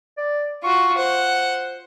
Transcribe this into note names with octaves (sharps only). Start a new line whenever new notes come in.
D5
F4 F#4 C#6
C5 F#5